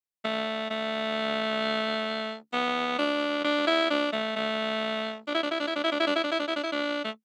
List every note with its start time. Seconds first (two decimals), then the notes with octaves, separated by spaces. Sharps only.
0.25 A3
0.71 A3
2.53 B3
2.99 D4
3.44 D4
3.67 E4
3.91 D4
4.13 A3
4.36 A3
5.27 D4
5.35 E4
5.43 D4
5.51 E4
5.60 D4
5.67 E4
5.76 D4
5.84 E4
5.92 D4
6.00 E4
6.07 D4
6.16 E4
6.24 D4
6.32 E4
6.39 D4
6.48 E4
6.56 D4
6.63 E4
6.72 D4
7.04 A3